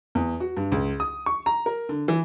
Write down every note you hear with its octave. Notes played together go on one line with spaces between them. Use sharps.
E2
F#4
G2
C#2
D#6
C#6
A#5
A#4
D3
E3